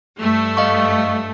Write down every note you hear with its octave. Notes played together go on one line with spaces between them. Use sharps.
G2 A3
D#5 F5 C#6